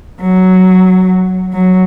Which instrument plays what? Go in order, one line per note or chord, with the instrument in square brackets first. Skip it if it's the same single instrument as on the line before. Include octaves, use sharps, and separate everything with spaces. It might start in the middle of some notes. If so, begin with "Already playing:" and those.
[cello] F#3
F#3